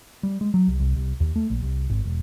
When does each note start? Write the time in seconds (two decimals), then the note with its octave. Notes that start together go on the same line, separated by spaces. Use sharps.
0.23 G3
0.41 G#3
0.54 F#3
0.68 C2
0.80 C2
0.96 C2
1.20 D#2
1.36 A3
1.50 A#1
1.63 C2
1.90 G#1
2.05 E1